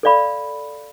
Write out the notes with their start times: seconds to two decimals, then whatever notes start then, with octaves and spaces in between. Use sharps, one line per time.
0.03 A4 D5 F5 B5